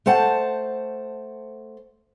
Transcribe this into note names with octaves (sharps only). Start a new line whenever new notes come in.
A3 C5 F#5 A5